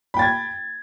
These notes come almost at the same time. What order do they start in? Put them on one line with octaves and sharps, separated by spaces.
B5 G5 A6 G#6